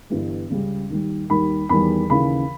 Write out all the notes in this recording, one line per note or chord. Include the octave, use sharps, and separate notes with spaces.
G1 G2 E3 G3
C#2 C#3 G3
D#2 D#3 G3
D#2 D#3 G3 B5
E2 D#3 G3 B5
D#2 C#3 E3 B5